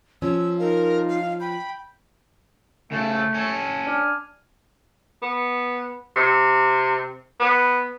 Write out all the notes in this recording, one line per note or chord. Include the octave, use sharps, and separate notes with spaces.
F3 C#4 E6
D#4 F4 A#4
F5
G5 B5
C#3 A3 A4
C#4 A4
D4 G#5 F6
B3
C3
B3